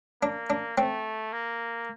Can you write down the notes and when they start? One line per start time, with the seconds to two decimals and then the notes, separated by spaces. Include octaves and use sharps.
0.22 A#3 D4
0.50 D4
0.78 A3 C4
1.33 A#3